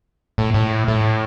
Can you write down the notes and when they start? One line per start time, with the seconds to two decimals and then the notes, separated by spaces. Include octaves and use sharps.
0.38 A2
0.54 A2
0.88 A2